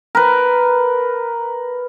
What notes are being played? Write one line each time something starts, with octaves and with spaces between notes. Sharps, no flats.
A#4 B4